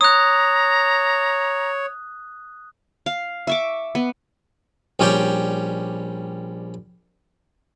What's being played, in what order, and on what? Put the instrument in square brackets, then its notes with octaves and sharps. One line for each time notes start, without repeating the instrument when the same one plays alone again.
[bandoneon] C#5 [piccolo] A#5 [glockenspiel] D#6 F#6
[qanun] F5
E5 C#6 D6
B3
[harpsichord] A#1 G3 C#4 C#5 D5 G5